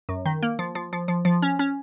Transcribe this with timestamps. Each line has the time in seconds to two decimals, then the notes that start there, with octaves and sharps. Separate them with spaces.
0.09 F#2
0.26 D#3
0.43 A#3
0.59 F3
0.75 F3
0.93 F3
1.08 F3
1.25 F3
1.42 C#4
1.59 C#4